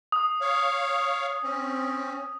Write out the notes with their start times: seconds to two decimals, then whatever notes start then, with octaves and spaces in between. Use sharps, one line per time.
0.12 D#6
0.41 C#5 F5
1.43 C4 C#4